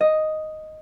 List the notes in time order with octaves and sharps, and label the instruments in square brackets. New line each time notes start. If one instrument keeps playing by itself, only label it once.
[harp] D#5